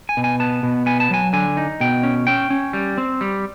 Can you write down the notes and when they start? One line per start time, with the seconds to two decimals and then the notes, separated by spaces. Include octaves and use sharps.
0.09 G#5
0.17 B2
0.24 G#5
0.40 B3 A5
0.63 B2
0.86 B3 G#5
1.00 A5
1.10 F#3 G#5
1.33 D3 G#5
1.57 D#4
1.80 B2 G5
2.03 C#4
2.27 C#4 G5
2.50 C#4
2.73 G3
2.98 C4
3.21 G3